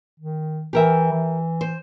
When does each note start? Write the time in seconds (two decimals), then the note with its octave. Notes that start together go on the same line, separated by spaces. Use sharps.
0.19 D#3
0.73 E3 G4 A#4 E5
1.12 E3
1.61 C5